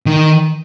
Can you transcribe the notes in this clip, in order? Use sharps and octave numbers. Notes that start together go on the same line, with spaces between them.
D#3